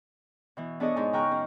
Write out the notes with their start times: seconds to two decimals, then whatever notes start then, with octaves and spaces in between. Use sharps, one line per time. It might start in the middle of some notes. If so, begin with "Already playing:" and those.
0.57 B2 E3
0.80 B3 D4 G#4 A4 C#5 D#5
0.96 G#2 D#4 G#5
1.13 C#3 A#4 G5 A#5 C#6 F#6
1.32 F#2